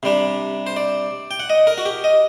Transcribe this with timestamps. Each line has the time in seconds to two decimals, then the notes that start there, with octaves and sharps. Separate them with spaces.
0.03 C3 G3 D4
0.67 C5
0.76 D5
1.31 G5
1.40 F#5
1.50 D#5
1.67 A#4
1.78 F#4
1.86 G4
2.04 D#5